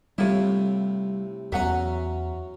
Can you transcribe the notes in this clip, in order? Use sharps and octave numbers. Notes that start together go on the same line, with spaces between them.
A2 C3 G3 C4 E4 F4 C#5
E2 F#3 C#4 E5 F#5 A#5